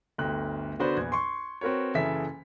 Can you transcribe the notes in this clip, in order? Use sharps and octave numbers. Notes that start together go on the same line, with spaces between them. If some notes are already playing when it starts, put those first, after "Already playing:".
G1 D2 G5 F#6
D3 B3 F#4 B4 C5 D5
A#1 E2 B3 G#6
C6 C#6
C4 F#4 A#4 B4 C#5
F#1 C#3 E3 A4 E5 B6